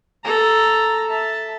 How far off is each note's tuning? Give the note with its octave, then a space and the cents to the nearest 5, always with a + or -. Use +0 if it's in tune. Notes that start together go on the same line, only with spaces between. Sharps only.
A4 +0 A#5 -5
E5 +0 A5 +0